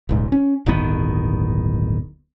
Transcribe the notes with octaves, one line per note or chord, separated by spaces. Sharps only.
D#1 C#2 G#2
C#4
D1 G1 D#3 B3